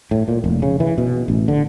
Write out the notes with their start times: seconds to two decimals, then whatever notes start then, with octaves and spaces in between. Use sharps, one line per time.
0.11 A2
0.28 A#2
0.44 F1
0.62 C#3
0.80 E3
0.98 B2
1.28 A1
1.48 D3